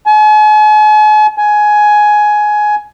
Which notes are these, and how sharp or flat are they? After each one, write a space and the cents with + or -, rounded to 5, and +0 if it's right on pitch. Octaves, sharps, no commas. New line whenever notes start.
G#5 +45
G#5 +15